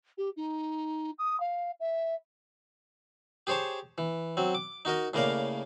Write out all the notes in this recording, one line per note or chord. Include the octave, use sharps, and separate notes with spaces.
G4
D#4
D#6
F5
E5
G4 G#4 C5 C#5 A5
E3
F#3 C4
D6
D#4 F#4 A#4 D#5
A2 C#3 A#3 A#4 D5 F5